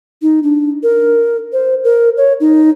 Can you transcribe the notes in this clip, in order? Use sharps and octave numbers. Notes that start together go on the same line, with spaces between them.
D#4
D4
A#4
C5
A#4
C#5
D#4